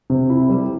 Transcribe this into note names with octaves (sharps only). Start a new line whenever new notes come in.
C3
E4
G3